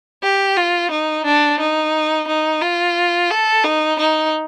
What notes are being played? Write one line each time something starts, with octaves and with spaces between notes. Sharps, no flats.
G4
F4
D#4
D4
D#4
D#4
F4
A4
D#4
D#4